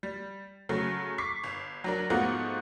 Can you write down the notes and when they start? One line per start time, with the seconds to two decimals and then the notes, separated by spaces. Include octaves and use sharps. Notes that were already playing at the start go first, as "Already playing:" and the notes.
0.03 G3
0.69 C#3 F#3 A3
1.18 C#6 D6 B6 C7
1.44 G1
1.84 F#3 D4 A#4
2.10 G#2 F3 A3 B3 F4 F#4